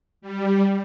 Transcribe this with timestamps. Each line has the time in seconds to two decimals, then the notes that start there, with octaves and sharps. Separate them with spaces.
0.22 G3